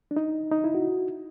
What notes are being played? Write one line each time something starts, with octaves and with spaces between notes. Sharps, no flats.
D4
D#4
D#4
E4
F#4